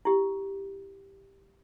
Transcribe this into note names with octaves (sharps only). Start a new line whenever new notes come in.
E4 G4